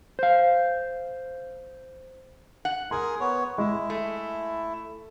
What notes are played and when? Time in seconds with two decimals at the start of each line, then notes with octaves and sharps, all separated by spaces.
0.19 C5 F5
2.65 F#5
2.91 G#4 A#4 G#5 C6
3.20 B3 C#5
3.58 G#3 E4
3.90 A3